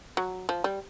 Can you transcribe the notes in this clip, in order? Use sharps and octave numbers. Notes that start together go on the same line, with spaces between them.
F#3
F3
G3